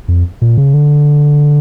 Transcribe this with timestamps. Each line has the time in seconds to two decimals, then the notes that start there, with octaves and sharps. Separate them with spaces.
0.08 F2
0.42 A#2
0.57 C#3
0.74 D3